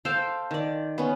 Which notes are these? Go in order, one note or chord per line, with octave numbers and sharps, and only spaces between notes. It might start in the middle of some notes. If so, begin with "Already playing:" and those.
A4 C5 F5 G5
D#3 D5
B3 C#4